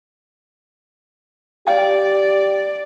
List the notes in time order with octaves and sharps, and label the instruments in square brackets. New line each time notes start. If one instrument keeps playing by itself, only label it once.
[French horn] G4 [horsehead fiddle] D5 [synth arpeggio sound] F5 G5